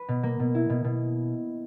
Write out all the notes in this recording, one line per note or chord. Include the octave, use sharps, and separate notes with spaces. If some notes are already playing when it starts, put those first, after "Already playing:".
Already playing: B4
B2
A#3
B2
E4
B2
B2